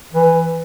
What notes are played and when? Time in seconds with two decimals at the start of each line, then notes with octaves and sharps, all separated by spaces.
0.13 E3